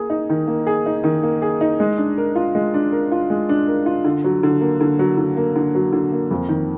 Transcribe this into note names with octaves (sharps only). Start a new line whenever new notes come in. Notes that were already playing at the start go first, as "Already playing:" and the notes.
Already playing: A#3 G#4
D#4
D#3
A#3
G#4
D#4
D#3
A#3
G#4
D#4
G#3
D4
A#4
F4
G#3
D4
A#4
F4
G#3
D4
A#4
F4
D3
F#3
D3
A#3
D3
F#3
D3
A#3
D3
F#3
D3
A#3
F2
D#3